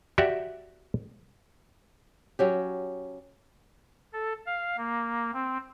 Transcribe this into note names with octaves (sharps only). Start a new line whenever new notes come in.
F#4 G4 D5 E5
F#3 C#4 G4
A4
F5
A#3
C4